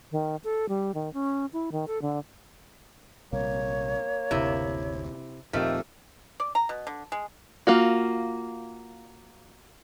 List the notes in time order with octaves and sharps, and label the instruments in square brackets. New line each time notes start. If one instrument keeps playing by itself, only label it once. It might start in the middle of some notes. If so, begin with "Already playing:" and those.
[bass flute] D#3
A4
G3
D#3
C#4
E4
D#3
A4
D3
[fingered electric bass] A#1 C3 G3 [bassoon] A#3 [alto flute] C#5
[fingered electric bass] F#1 D2 [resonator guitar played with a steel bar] C3 E4
[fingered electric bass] D#1 A#2 C4 [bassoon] D#3 [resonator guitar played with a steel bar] F3 A3 [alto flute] G4
[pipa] D5
A#5
B2
D3
G#3
[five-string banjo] A#3 F4 F#4